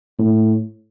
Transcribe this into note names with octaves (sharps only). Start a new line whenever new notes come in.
A2